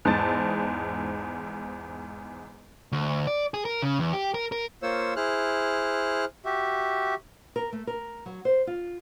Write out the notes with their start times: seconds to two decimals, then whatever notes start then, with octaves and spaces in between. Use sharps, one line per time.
0.05 E2 G#2 D#4 C5 A5 A6
2.92 D2
3.27 D5
3.54 G#4
3.65 A#4
3.82 C#3
3.99 E2
4.13 G4
4.34 A#4
4.52 A#4
4.82 A#3 F4 C5 C#5 E6
5.16 E4 G#4 C5 F6 F#6
6.45 F#4 G4 E5
7.56 A#4
7.73 A3
7.87 A#4
8.26 F#3
8.45 C5
8.67 F4